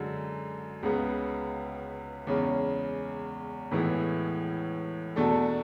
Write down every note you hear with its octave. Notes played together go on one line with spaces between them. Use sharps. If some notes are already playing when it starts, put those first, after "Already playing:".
Already playing: F#2 D3 G#3
C#2 C#3 G#3 B3
E2 C#3 G#3 C#4
A2 E3 G#3 B3 E4
E2 B2 A3 D4 A4